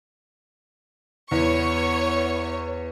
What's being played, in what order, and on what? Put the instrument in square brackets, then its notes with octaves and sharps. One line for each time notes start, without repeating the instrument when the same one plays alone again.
[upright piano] E2 [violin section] B3 C#5 C#6